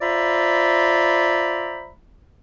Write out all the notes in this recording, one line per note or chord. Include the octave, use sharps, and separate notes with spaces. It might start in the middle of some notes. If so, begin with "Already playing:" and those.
F4 C5 D5 E5 A#5 B5